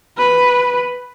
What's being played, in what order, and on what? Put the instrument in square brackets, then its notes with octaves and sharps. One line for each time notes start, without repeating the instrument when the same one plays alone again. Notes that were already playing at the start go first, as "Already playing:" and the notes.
[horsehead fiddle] B4